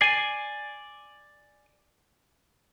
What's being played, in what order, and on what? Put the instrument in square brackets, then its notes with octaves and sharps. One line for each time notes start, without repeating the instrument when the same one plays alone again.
[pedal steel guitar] D5 G#5 [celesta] C7 D#7